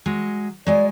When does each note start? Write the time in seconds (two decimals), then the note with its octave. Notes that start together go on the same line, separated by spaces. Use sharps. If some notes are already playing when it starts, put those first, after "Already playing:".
0.06 F#3 G#3
0.67 F#3 G#3 D5 G#5